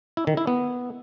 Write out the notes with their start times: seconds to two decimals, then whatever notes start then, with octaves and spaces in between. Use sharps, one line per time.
0.17 E4
0.27 D#3
0.37 E4
0.47 B3